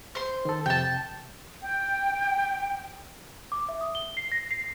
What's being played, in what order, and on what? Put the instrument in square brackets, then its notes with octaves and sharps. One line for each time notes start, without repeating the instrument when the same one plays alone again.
[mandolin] C5 C6
[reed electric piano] D#3 A4
[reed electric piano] F2 C3 [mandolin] G5 A5
[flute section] G5
[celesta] D6
E5
D#6
G7
C7
A#6
C7